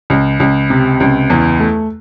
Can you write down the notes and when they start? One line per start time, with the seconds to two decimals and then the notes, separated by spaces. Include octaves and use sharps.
0.10 C#2
0.40 C#2
0.70 C3
1.00 C#2
1.30 E2
1.60 A3